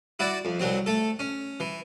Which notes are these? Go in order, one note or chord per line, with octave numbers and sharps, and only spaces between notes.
E4 F#4 D5
F2
C2 F#3 C4
A3 A4
C#4
E3